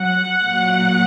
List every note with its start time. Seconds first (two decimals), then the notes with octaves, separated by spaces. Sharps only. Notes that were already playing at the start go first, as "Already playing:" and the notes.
Already playing: F#3 F#5
0.45 A#2 F#3